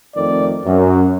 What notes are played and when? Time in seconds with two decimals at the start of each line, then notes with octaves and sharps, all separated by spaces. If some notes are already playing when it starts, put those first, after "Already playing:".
0.15 F2 D#3 A3 D5
0.65 F#2